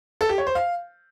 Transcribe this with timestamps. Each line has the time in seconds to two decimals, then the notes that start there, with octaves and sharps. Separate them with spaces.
0.21 A4
0.29 G4
0.38 C#5
0.47 C5
0.55 F5